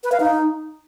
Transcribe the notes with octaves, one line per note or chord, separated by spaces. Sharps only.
B4
F5
D#4